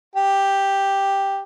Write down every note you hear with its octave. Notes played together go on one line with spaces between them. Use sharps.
G4